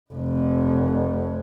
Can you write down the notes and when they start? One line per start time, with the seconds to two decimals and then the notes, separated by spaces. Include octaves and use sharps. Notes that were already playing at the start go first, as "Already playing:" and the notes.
0.13 F1 F2